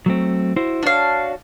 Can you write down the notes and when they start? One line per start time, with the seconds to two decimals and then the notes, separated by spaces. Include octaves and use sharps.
0.06 F#3 A3 C4
0.56 E4 F#4 C5
0.83 D4 F#4 C#5 F5